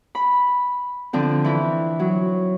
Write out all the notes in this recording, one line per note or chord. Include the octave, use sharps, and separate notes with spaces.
B5
D3 F3 C4
E3 E4
F#3